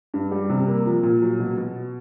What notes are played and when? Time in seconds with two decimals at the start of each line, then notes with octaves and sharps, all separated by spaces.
0.14 G2
0.31 G3
0.50 C3
0.68 A#3
0.85 F3
1.03 A#2
1.22 F#3
1.39 B2
1.57 B2